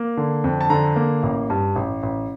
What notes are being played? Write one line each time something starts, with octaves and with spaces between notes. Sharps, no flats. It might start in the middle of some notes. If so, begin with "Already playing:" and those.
Already playing: A#3
D3
F2
A5
D3 A#5
A#3
A1
G2
A1
A1